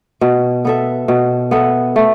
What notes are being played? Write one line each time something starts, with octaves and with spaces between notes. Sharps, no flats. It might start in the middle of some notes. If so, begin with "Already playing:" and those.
B2
B3 A4 E5
B2
B3 A4 E5
A3